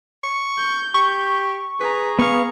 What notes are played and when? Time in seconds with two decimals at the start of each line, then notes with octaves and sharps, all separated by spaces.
0.23 C#6
0.58 G6
0.94 G4 C#6
1.80 G#4 B4 A#5
2.19 B3 F5 C#6